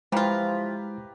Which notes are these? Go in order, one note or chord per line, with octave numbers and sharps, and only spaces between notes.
E3 F3 G#3 E4 F4 G4 B4 A#5